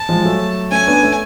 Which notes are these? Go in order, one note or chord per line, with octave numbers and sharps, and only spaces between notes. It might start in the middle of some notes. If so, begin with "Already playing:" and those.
Already playing: A5
F3 G#3
F#3 A3
A3 C#4 G#5
B3 D4
A3 C#4